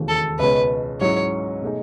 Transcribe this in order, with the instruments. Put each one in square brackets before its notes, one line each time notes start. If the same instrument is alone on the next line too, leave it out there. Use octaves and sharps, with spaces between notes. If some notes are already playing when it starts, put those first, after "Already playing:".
Already playing: [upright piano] E1 D#2 C#3 E3 A3
[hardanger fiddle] A4
[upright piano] C#2 B2 G#3 C#4 [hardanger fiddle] B4
[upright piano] G#2 F#3 C#4 E4 G#4 [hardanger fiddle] C#5
[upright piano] B2 A3 D#4 G#4